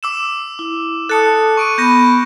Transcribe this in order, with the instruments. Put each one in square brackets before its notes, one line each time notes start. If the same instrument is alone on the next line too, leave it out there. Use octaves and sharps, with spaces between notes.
[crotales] D6 E6 E7
[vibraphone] E4
[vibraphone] A4 A5 D#6 [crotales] F#6 C#7
[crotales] C#6 D7 D#7
[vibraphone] B3 B5 [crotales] G6 A#6 D#7